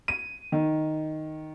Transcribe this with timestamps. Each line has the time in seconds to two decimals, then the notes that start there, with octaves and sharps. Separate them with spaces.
0.08 D#7
0.52 D#3